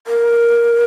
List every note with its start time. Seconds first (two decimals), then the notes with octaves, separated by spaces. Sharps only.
0.07 A#4